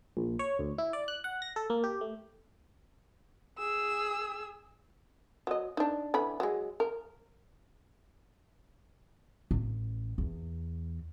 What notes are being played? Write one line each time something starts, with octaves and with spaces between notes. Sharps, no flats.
A#1
C#5
D2
E4
D5
F#6
F#5
A#6
A4
A#3
G4
A3
G#4 E6
F#3 D#5
D4 D#4
D3 E3 B5
F#3 G#3
A#4
A1
E2